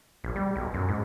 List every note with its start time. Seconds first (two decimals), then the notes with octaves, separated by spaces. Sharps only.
0.24 A#1
0.36 G3
0.56 B1
0.74 F#2
0.89 G#2